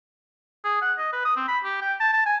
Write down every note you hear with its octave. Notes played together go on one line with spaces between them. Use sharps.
G#4
F#5
D#5
B4
D#6
C4
B5
G4
G5
A5
A5
G#5